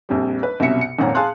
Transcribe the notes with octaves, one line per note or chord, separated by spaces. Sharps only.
A#1 F2 G3
B4
C2 F#2 B2 E5 C#7
C#7
G#1 F2 A#2 C#4 F#5 A#5
G#4 F5 G#5 A5 C6 F#6